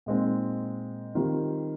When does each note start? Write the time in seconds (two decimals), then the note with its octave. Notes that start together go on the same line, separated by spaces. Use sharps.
0.06 A#2 G#3 C4 D#4
1.15 D#3 G3 C4 F4